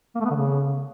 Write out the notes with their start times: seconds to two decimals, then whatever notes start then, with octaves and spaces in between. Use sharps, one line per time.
0.15 A#3
0.20 A3
0.25 B3
0.30 D3
0.35 C#3